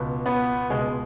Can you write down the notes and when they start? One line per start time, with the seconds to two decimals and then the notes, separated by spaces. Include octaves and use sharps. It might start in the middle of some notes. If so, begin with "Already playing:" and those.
Already playing: C#2 B2
0.26 B3
0.70 C#2 B2 G#3